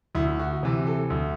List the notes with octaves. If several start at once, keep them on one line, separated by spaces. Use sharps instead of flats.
D2 E4
F#4
C3 E3
A4
D2